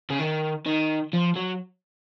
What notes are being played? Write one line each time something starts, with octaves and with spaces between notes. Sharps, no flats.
C#3
D#3
D#3
F3
F#3